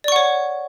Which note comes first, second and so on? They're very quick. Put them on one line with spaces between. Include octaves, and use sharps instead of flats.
D5 C#6 F#5 C#5